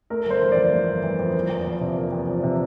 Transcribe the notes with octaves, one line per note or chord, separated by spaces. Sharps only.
A3 A#4
G1 C5
E3
F2 D5
A3
G1
E3
F2
A#3
E2
F3
C3
A#3
E2
F3
C3